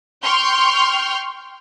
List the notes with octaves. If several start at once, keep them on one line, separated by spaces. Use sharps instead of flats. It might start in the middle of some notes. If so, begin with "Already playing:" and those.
G5 C6 C#6 F6 G6